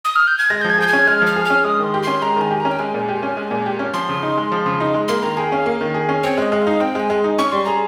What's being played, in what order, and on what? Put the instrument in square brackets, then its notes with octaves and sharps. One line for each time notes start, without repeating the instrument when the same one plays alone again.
[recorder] D#6
F6
G6
G#6
[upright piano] G#3 [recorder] A#6
[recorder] G6
[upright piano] F3
[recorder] G#6
[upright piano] G#4 [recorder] G6
[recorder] G#6
[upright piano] C#4
[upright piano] G#3 [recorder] F6
[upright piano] F3 [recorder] F6
[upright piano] G#4
[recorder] F6
[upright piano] C#4
[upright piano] G#3 [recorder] D#6
[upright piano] D#3 [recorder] C6
[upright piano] G4
[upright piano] C#4 [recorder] C6
[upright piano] G#3 [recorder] A#5
[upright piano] D#3
[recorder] G#5
[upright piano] G4
[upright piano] C#4 [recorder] A#5
[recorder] G5
[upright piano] G#3 [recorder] G#5
[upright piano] A#2
G4
C#4
G#3
A#2
G4
C#4
[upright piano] F3 [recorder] C6
[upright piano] C#3
D#4
G#3
F3
C#3
D#4
G#3
[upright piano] A#3 [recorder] C6
[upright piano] D#3 [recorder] A#5
[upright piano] G#4 [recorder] G5
[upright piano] C#4 [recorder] F5
[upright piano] A#3
D#3
G#4
C#4
[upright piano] C4 [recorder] C#5
[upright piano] G#3 [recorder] D#5
[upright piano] G#3
[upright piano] D#4 [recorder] F5
[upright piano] C4 [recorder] G5
[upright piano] G#3 [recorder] G#5
[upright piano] G#3
D#4
[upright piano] C#4 [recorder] C#6
[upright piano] G3 [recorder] C6
[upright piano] G#4 [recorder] A#5